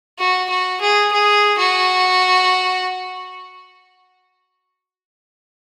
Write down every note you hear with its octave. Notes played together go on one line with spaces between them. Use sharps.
F#4
F#4
G#4
G#4
F#4